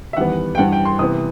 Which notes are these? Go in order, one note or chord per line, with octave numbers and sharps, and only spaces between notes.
E5
E2 D#3 G3 B3 F#5
G5
G2 E3 G3 F#5
G5
C6
C3 E3 B3 D#6